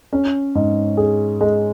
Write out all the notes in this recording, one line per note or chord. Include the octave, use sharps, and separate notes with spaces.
C#4
G#2
G#4
G#3